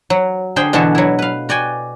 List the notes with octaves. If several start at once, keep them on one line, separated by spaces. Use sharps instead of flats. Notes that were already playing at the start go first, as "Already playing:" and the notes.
F#3
D3 G#4 C5 G5
B2 D3 E3 F#4 A5
F#3 E4
B4 F5
F#4 D5 G5 G#5